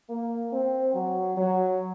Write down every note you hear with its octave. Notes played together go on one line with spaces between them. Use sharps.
A#3
C4
F#3
F#3